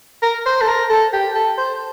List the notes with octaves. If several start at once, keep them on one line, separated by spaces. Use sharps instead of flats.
A#4
C5
A4
A#4
A4
G4
A4
C5